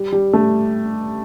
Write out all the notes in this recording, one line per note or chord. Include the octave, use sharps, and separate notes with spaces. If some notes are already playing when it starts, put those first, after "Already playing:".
Already playing: G3
G3
A3